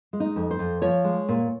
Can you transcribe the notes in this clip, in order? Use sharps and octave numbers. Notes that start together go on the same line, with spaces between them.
G#3
D#4
F2
C5
F2
F3 C#5
G#3
A#2